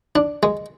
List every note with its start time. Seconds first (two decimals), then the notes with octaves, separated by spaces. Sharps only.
0.16 D4
0.43 G#3